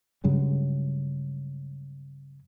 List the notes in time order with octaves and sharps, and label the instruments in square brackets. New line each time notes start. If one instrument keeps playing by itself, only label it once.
[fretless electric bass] G2 C#3 F#3 G#3